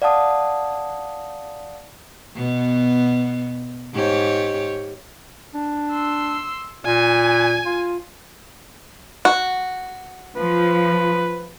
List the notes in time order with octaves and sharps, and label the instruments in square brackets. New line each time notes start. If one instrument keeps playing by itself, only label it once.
[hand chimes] D5 F5 F#5 A5 D#6
[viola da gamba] B2 B3
G#2 G4 C#5
[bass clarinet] D4
[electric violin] C6 E6
[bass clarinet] A#2 [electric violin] G#5
[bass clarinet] F4
[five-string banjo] F#4
[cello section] F3 [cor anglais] B4